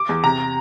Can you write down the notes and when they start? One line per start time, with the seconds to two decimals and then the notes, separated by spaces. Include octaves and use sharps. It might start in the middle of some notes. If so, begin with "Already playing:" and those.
Already playing: D6
0.09 E2
0.24 C3 A#5